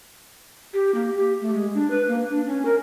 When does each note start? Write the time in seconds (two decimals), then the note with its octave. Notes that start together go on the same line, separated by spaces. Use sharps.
0.73 G4
0.95 A#3
1.16 G4
1.41 A3
1.54 G#3
1.74 D4
1.90 B4
2.08 A#3
2.30 D4
2.47 C#4
2.65 A#4